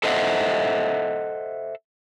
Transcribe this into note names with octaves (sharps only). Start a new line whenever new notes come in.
A4 C5 D#5 E5 F#5